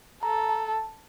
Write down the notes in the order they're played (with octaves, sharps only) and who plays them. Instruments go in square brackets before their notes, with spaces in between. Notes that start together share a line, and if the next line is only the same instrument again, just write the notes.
[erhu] A4 [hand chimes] A#5
[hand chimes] A5